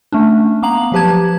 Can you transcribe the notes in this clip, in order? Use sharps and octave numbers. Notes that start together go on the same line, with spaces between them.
A3 C#4 D4
A#3 B3 F5 A#5 F#7
F3 F#3 G4 B4 A5 G#6